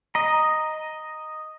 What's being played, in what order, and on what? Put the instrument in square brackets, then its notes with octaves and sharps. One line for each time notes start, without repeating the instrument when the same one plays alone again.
[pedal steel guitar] D#5 A#5